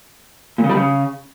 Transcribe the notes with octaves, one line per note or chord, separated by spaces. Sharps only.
A#2
C#3
G3
C#3